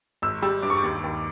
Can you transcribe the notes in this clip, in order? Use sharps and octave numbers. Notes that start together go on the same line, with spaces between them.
G#1 E6
G3 E6
G2 D6
C#6
D6
D#2
D#2